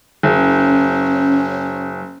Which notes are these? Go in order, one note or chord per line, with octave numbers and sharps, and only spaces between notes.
F#1 C#4